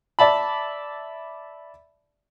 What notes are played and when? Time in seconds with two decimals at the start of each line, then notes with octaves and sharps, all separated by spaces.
0.19 D5 E5 A5 B5